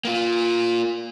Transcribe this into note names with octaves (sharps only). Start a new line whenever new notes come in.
A#3 F4